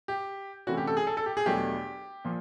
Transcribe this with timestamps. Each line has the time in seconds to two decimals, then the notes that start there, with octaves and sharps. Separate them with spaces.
0.08 G4
0.67 C3 E3 A3 C#4 F#4
0.77 G4
0.87 A4
0.97 G#4
1.07 A4
1.17 A4
1.26 G4
1.37 G#4
1.46 E2 B2 F#3 A3 D4 G4
2.25 A#2 F3